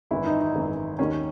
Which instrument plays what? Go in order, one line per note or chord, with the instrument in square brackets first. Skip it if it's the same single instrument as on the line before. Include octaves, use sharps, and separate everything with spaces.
[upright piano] G#1 F#2 E3 E4
D#4
D#4
G#1 F#2 E3
D#2 D#3 C#4